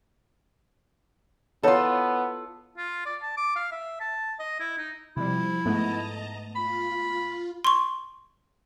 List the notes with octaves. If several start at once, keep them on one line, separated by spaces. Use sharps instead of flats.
B3 E4 F4 A4 C#5 D#5
F4
D5
A5
D6
F5
E5
A5
D#5
E4
D#4
C3 F3 G3 E4
G#2 A3 B3 D#5 A5 A#5
F4 B5
C6 C#6